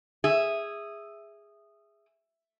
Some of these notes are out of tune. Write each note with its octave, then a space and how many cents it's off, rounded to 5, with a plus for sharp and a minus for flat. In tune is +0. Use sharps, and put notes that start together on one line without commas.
G#4 -15 E5 +0